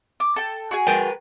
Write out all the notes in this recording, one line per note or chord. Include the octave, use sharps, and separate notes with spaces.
D6
A4 G5
F#4 G#4 G#5
A#4 B4 G5